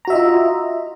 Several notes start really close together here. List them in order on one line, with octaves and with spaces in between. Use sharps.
A#5 F#4 E5 D#5 F4